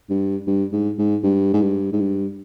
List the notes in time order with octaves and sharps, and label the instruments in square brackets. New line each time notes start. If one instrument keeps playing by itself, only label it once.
[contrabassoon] G2
G2
G#2
G#2
G2
G#2
G2
G#2
G2